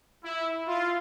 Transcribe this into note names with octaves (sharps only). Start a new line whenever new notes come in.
E4
F4